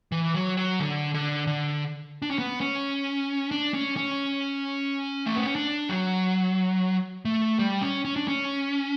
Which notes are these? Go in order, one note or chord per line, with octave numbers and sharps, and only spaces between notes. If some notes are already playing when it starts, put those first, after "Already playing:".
E3
F#3
F#3
D3
D3
D3
D4
C#4
B3
C#4
D4
C#4
C#4
A3
B3
C#4
D4
F#3
A3
G3
C#4
C#4
D4
C#4